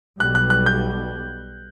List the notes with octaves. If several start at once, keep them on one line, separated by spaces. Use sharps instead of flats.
B1 B2 G3 F#6
F#6
F#6
G6